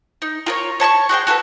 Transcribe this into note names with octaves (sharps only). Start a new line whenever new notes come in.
D#4
F4 A#4 C#5
C#5 A5 B5 C#6
F#4 G#4 C5 G5
F#4 G#4 A4 B4